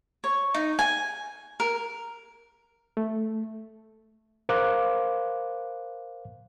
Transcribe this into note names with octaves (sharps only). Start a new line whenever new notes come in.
C#5
D#4
G#5
A#4
A3
A#4 C5 F5 D6 F#6